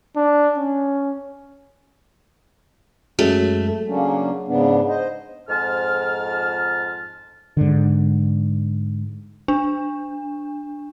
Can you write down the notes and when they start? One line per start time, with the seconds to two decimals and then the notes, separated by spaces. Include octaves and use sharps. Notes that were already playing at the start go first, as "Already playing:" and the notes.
0.16 D4
0.57 C#4
3.19 F#2 F#3 G#3 A3
3.89 C#3 F#3 A#3 C#4 D4
4.48 G#2 C#3 B3 D4
4.89 C5 D#5
5.49 F2 G#2 A5 F6
7.57 G#2 D3
9.48 D4